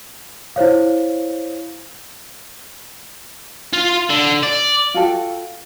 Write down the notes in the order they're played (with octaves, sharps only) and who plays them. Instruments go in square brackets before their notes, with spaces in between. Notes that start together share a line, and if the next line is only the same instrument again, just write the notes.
[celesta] E4 C5 C#5 F5
[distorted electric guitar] F4
D3
D5
[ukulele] F4 F#4 A4 G5